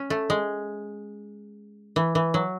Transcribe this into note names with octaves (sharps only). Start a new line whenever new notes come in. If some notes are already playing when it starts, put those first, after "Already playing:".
Already playing: C#4
A3
G#3
E3
E3
F#3